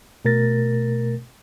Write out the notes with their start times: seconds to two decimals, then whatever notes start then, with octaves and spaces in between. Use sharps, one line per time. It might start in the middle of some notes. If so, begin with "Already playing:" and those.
0.25 B2 A3 A#4 A6 A#6